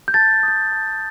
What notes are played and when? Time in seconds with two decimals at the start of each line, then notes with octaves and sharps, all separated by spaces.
0.08 G6
0.14 A5 A6
0.43 D#6 G6
0.72 A5